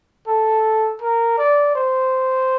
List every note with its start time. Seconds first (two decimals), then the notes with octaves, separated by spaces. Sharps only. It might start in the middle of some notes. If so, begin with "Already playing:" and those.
0.27 A4
1.02 A#4
1.38 D5
1.75 C5